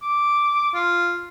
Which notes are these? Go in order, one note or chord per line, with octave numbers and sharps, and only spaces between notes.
D6
F4